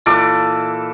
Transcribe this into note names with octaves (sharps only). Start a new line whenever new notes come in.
A#2 E3 A4 D6